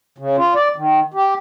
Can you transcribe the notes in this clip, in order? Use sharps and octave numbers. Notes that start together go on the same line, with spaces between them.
C#3
F4
D5
D#3
G4